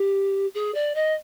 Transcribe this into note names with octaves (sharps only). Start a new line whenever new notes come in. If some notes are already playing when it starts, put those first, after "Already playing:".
Already playing: G4
G#4
D5
D#5